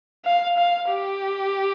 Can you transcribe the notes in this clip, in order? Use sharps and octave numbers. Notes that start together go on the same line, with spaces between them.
F5
F5
G4